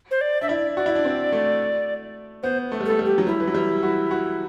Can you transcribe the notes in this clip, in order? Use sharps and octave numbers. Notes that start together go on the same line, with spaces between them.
C5
D5
D4 E5
E4 D5
F#4 D5
E4
D4
C4
A3
B3 C5
A3
G3
A3 A4
G3
G4
F#3
G3 E4
E3
F#3
G3
F#4
F#4